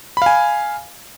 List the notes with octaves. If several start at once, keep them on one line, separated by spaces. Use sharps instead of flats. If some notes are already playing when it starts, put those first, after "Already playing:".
F5 G#5 B5